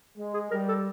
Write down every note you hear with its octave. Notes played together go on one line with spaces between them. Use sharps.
G#3
G#4
G3 A#4
A4